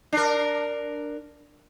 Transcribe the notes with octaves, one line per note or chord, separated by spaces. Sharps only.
D4 A#4